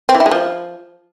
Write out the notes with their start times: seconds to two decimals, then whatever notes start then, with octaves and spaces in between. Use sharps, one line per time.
0.09 C4
0.15 E3
0.20 E4
0.26 G#3
0.31 F3